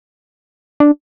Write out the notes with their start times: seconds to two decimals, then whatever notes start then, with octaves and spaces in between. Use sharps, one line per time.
0.80 D4